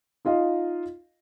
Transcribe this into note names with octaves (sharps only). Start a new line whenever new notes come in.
D#4 F4 D#5 F5